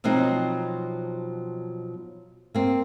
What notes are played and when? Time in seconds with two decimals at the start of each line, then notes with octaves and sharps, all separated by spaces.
0.04 B2 F3 F#3 C4 D#4
2.55 A#3 C4